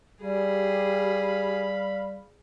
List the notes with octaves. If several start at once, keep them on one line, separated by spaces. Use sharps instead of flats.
G3 G4 G#4 F5 B5